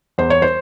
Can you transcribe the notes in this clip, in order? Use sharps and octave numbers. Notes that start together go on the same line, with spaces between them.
E2 C5
C#5
C5